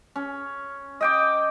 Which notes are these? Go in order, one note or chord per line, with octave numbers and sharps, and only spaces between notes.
C#4
D#5 G5 D6